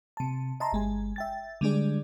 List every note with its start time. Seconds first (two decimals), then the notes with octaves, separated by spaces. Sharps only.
0.17 C3 A5
0.60 D#5 E5 A5 A#5 C6
0.72 G1 G#3 G#5
1.16 E5 G5 A6
1.61 D3 G3 G#3 D4 G#4 D5